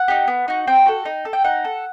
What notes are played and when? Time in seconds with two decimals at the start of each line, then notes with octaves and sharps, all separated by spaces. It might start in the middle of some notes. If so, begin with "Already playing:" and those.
Already playing: F#5
0.08 D#4 G4
0.28 B3
0.48 D#4 F#4
0.67 C4 G5
0.86 F#4 A4
1.05 D#4
1.25 A4
1.33 G5
1.44 D#4 F#5
1.64 A4